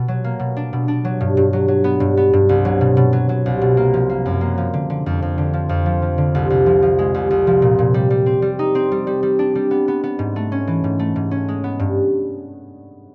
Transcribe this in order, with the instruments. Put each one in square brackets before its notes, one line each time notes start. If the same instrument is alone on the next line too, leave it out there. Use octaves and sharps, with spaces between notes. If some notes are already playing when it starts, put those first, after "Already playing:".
Already playing: [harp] B2
F#3
A#3
B2
D4
B2
D4
F#3
G2
G2
F#3
F#3
B3
G2
B3
G2
C2
F#3
B2
B2
F#3
F#3
C2
B2
A#3
F3
A#3
F#2
A#3
F3
D3
D3
F2
F2
D3
F3
F2
F3
F3
D3
C2
C2
F3
F3
G#3
C2
C2
F3
A#2
A#2
G3
G3
C4
G3
D#4
C4
G3
G3
G3
D4
G3
B3
B3
B3
G#2
A3
C#4
E3
G#2
A3
G#2
C#4
G#3
B3
G2